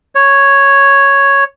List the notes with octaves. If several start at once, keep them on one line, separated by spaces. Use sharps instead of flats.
C#5